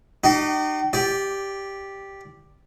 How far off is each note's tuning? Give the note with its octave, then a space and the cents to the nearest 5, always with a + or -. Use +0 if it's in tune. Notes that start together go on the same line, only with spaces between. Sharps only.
D#4 -40 G4 -40
G4 +0 D5 -15